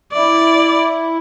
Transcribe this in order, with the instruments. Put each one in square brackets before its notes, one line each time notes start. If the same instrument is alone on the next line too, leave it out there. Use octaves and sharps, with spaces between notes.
[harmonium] E4 [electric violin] D5